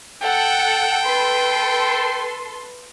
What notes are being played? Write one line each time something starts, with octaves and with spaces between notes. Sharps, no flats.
A4 F#5 G5
A4 B4 C6